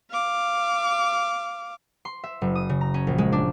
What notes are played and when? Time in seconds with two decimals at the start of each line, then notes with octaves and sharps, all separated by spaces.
0.11 F5 D6
2.05 C6
2.24 E5
2.41 F#1
2.55 D#6
2.69 C#3
2.81 A#5
2.94 C#4
3.07 A#1
3.18 G#3
3.32 D4